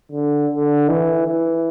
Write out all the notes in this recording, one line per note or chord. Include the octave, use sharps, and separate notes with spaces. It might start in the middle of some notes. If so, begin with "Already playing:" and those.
D3
D3
E3
E3